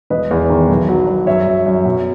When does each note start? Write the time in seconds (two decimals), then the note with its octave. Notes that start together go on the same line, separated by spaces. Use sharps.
0.10 E1 B4 D#5
0.31 E2
0.50 D#3
0.69 B1
0.89 F#3
1.08 F#3
1.27 F#2 C#5 E5
1.47 F#2
1.66 F#2
1.85 B2